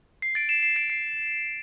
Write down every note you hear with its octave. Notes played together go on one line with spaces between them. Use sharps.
C7
A6 D7
C7 E7
C7 E7
A6 D7
C7